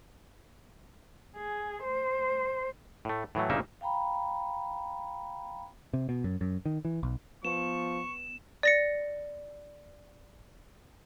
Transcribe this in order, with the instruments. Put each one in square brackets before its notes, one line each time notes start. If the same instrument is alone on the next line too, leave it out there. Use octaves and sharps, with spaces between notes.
[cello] G#4
C5
[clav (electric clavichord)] A2 A3
A2 E3 F#3 A3
G1 A#2 C#3 A#3 D#4 E5
[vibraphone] F5 G5 A#5 B5
[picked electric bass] C3
B2
F#2
F#2
D#3
E3
B1
[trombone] F3 [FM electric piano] B3 [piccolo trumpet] C#6 [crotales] E7
[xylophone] D5 A#6 C#7